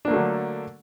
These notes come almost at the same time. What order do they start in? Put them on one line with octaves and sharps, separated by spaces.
D4 A#3 A3 F#3 D3